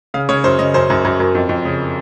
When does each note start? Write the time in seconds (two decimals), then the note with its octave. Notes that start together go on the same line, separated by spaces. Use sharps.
0.14 C#3 F5
0.29 C#3 C#5
0.44 F#2 C5
0.59 C#3 D#5
0.74 F#2 C5
0.90 F#2
1.05 F#2
1.20 F#2
1.35 F2
1.49 F2
1.65 C#3